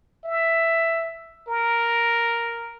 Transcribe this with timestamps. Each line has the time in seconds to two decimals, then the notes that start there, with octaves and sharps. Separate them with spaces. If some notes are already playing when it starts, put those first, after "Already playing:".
0.24 E5
1.48 A#4